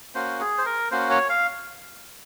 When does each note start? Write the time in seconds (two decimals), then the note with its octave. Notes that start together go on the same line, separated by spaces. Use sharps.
0.15 A#3 C#4 F#4 C5
0.40 G#4
0.58 C5
0.66 A#4
0.91 A#3 C#4 F#4 C5
1.10 C#5
1.29 F5